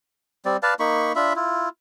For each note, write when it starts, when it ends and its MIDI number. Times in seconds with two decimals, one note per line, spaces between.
0.45 0.57 55
0.45 0.57 60
0.45 0.57 74
0.63 0.74 71
0.63 0.74 74
0.63 0.74 77
0.63 0.74 81
0.80 1.13 58
0.80 1.13 63
0.80 1.13 83
0.80 1.13 85
1.16 1.33 62
1.16 1.33 65
1.16 1.33 76
1.16 1.33 83
1.36 1.69 64
1.36 1.69 65